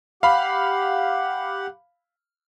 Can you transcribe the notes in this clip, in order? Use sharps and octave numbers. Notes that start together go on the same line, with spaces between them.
G4 F5 F#5 B5